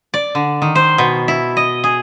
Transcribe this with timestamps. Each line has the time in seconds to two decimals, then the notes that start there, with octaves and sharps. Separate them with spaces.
0.14 D5
0.35 D3
0.62 D#3
0.75 C5
0.98 B2
1.28 E4
1.57 D#5
1.84 G#4